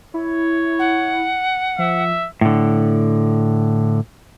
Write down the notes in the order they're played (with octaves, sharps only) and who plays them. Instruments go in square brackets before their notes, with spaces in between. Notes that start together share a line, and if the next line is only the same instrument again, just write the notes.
[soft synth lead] E4 [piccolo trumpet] C#5
[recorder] F#5
[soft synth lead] F3 [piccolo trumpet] E5
[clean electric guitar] A2 D3